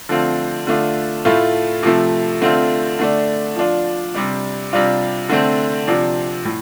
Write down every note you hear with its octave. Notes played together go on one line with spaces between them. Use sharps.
D3 F3 A3 C4 F4
D3 A3 D4 F4
A2 A3 F4
C3 F3 A3
D3 A3 C4 F4
D3 A3 D4
F3 D4 F4
C3 G3 D4
C3 G3 D4 F4
D3 A3 C4
C3 F3 D4
A2